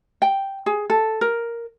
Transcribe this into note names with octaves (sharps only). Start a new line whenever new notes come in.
G5
G#4
A4
A#4